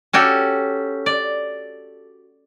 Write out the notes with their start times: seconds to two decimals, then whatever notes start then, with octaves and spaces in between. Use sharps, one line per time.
0.13 C#4 F#4 G4 A4
1.06 D5